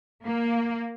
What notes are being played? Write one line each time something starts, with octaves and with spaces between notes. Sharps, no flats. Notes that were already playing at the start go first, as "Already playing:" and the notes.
A#3